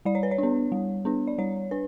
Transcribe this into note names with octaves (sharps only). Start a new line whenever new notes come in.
G3 D5
C#5
B4
C#5
B3 D4
G3
B3 D4
D5
G3 C#5
D4 B4